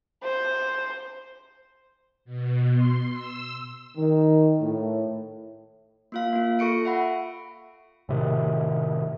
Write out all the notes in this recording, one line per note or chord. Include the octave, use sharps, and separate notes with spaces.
C5
B2
C6
E6
D#3
A2
A#3 F4 F5
A#3 F4
F4 A4 C#6 C#7 D7
E5 F#5 B5
A2 C3 D#3